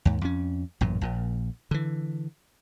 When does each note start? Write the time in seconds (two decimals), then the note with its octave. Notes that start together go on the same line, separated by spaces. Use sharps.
0.05 D#2 G#2
0.21 F2 C#4
0.81 A1 F#2 A#2
1.01 A#1 A#2
1.71 D3 E3